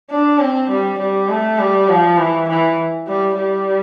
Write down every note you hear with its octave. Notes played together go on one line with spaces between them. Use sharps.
D4
C4
G3
G3
A3
G3
F3
E3
E3
G3
G3